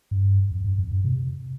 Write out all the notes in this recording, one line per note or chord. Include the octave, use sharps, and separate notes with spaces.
G2
F2
G2
F2
G2
C3